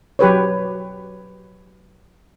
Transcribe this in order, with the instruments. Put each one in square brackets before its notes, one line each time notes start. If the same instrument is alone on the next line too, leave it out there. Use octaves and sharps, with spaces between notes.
[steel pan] F#3 G4 B4 C#5